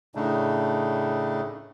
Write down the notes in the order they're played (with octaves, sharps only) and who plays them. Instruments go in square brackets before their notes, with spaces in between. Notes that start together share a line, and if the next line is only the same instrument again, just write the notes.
[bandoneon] A2 C#3 A3 D4 D#4